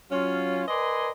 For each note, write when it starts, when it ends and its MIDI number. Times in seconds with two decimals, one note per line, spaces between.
0.11 0.63 54
0.11 0.63 61
0.11 0.63 65
0.68 1.09 70
0.68 1.09 71
0.68 1.09 74
0.68 1.09 75
0.68 1.09 80
0.68 1.09 84